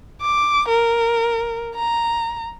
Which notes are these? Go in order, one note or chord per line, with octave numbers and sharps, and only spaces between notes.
D6
A#4
A#5